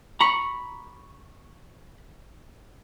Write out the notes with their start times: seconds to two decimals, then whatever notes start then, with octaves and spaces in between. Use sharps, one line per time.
0.21 A#5 B5 C#6